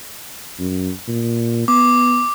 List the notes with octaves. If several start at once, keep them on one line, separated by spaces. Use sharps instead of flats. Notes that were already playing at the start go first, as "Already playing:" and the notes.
F#2
A#2
B3 D6